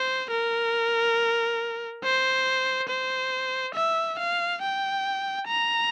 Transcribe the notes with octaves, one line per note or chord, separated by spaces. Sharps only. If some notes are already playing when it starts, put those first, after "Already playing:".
Already playing: C5
A#4
C5
C5
E5
F5
G5
A#5